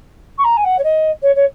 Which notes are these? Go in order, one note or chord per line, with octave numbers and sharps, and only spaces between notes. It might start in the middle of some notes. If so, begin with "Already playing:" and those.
C#6
A#5
G#5
F#5
C#5
D#5
C#5
C#5